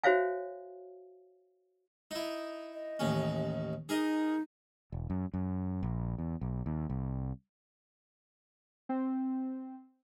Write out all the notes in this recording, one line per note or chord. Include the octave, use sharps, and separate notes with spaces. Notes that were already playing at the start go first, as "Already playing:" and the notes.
F#4 C5 C#5 E5 F5 G#5
D#4 E4
D#5
A1 D#2 C#4
D#4 G#4 A#4 D#5
E1
F#2
F#2
A#1
E2
B1
D#2
C2
C4